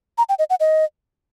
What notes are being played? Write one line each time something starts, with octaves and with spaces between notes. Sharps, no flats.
A#5
G5
D#5
F#5
D#5